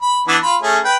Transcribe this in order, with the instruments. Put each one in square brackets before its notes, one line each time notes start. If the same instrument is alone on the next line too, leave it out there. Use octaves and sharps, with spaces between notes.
[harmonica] B5
E3 B3 D4
F4 B5
A3 C#4 G#4
B4 G5